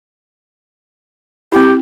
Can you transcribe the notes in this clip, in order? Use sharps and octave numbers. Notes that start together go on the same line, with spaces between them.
C4 E4 G4